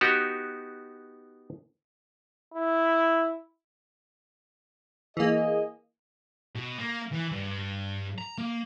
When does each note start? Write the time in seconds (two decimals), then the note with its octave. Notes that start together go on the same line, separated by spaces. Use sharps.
0.01 B3 D#4 F#4 G4
2.54 E4
5.17 E3 A#3 G#4 D#5
6.55 B2
6.79 A#3
7.12 E3
7.32 G2
8.18 A#5
8.38 A#3